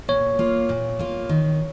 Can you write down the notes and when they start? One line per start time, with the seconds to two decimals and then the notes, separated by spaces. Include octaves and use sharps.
0.08 A#2 C#5
0.39 A#3 F4
0.69 A#2
0.99 A#3 F4
1.29 D#3